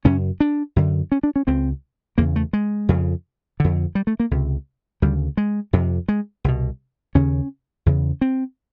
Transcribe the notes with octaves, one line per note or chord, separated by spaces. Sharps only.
F#2 C#3 C#4
D4
F#2 D3
C#4
D4
C#4
C#2 C#3 C4
E2 C#3 A#3
A3
G#3
F2 C#3
F2 D3
G3
A3
A#3
C#2 C3
D2 C#3 G3
G#3
F2 C3
G#3
C2 B2
D#2 C#3 C#4
E2 C#3
C4